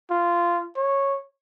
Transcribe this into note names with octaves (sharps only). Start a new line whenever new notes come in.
F4
C#5